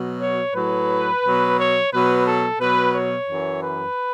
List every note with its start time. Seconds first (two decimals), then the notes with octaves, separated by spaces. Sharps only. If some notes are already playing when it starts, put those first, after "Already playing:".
Already playing: B2 F#3
0.21 C#5
0.55 A2 F#3 B4
1.23 B2 F#3
1.58 C#5
1.92 B2 F#3 B4
2.26 A4
2.60 B2 F#3 B4
2.94 C#5
3.29 F#2 E3
3.63 B4